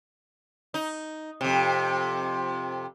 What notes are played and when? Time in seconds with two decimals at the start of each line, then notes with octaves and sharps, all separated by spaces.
0.74 D#4
1.41 F2 C3